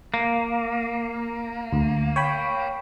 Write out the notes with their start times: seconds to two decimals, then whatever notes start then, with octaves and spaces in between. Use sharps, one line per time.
0.14 A#3
1.73 D2
2.16 C#5 G5 B5